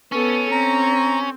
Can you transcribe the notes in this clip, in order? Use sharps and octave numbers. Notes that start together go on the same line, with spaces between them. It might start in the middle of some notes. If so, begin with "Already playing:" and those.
B3 C#4 A4
C4 A#5